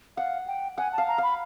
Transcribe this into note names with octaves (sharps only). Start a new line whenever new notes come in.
F5 F#5
G5
F#5 G#5
A5
F5
A#5
F5 B5